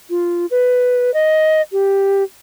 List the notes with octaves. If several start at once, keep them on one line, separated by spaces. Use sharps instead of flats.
F4
B4
D#5
G4